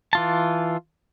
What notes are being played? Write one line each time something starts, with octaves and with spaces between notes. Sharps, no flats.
E3 F4 A5